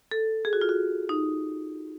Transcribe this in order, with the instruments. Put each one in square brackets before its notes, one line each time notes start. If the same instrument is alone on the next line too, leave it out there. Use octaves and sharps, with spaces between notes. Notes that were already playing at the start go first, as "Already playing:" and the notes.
[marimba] A4
G#4
F#4
F4
F#4
D#4